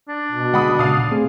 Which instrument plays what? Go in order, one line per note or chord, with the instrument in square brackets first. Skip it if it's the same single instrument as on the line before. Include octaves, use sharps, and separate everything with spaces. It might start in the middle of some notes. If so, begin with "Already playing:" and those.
[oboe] D4
[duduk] B2
[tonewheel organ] D3 G#3 [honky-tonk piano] F#5 B5 D#6
[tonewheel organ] A#2 C#3 A5 [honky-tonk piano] F5 D#6
[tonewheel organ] A3 C4 G#4